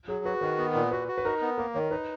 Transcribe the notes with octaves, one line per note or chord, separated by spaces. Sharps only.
F#3 G#4
F#4 B4
D#3 B4
B3
A#2
F#4 B4
F#4
B4
D#4 A#4
B3
A#3 A#4
D#3 C#5
D#4 B4